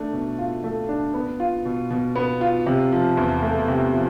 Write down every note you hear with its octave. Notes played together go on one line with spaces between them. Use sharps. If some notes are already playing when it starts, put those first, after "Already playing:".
Already playing: A3 D4
B2
F4
A3
D4
B3
F4
B2
B2
B3
F4
C3
F3
E2
A3
C3
F3